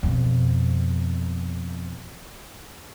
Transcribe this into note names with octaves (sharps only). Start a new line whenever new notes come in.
F2 B2